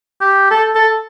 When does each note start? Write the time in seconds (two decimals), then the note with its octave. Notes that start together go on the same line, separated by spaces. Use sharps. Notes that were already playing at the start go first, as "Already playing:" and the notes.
0.21 G4
0.51 A4
0.75 A4